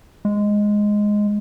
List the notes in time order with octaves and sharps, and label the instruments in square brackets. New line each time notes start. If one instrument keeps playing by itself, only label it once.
[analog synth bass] G#3